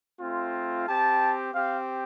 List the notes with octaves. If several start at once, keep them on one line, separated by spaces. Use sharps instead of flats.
A3 C4 F4
C4 G4 A5
C4 G4 F5